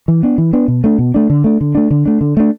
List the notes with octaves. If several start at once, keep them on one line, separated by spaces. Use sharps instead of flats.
E3
B3 D4
E3
B3 D4
B2
A3 D4
B2
A3 D4
D3
A3 D4
D3
A3 D4
D3
A3 D4
D3
A3 D4